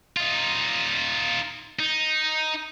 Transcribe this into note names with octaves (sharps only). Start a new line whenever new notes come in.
D#4 F4
D#4